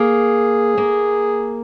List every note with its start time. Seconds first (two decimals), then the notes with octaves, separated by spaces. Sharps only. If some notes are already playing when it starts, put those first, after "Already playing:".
Already playing: A#3 G#4
0.78 A#3